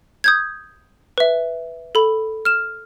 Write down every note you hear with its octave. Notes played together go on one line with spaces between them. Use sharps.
D#6 G6 G#6
B4 E5
A4 B5
F6 E7